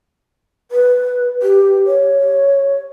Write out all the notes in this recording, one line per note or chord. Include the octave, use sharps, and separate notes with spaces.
B4
G4
C#5